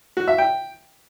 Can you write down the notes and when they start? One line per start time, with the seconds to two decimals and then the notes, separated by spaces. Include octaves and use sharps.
0.17 F#4
0.28 E5
0.38 G5